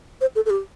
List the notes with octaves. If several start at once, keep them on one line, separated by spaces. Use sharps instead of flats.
C5
A4
A4
G4